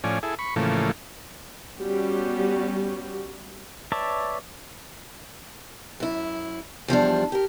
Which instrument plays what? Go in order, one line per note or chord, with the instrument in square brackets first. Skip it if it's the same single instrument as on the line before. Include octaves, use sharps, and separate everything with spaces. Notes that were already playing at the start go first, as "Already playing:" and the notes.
[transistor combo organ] A2 F3 C#4 D5 G#5
E4 G#4 A4
B5 C#6
A2 C#3 E3 F3 A3 A#3
[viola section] G3 B3 C#4 F#4 G4
[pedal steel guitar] B4 C#5 D5 E5 A5
[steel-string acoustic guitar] F#2 E4
E2 F3 G3 D4
G4 A#4